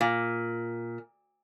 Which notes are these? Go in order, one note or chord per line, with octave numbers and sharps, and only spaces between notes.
A#2